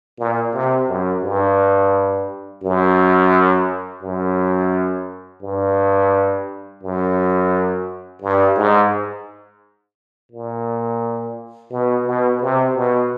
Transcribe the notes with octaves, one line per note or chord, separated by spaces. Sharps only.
A#2
C3
F#2
G2
F#2
F#2
G2
F#2
G2
G#2
A#2
B2
B2
C3
B2